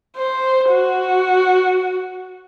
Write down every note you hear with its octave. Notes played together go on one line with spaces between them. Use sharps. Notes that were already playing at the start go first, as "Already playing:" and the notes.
C5
F#4